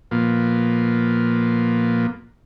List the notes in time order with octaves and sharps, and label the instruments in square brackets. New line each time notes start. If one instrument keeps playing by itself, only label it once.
[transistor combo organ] A#2 F3 A#3 B3